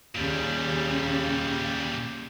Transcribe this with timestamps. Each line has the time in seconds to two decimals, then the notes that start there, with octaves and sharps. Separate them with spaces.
0.15 D#2 A#2 C#3 G3